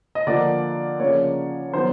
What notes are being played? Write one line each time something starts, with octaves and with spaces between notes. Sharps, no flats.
D#5
D3 F3 A#3 D5
C#3 F3 A#3 C#5
D#3 F#3 B3 C5